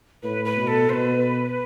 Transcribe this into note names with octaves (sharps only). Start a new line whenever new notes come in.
A2 B4
B4
B2
A4
B2 B4 C5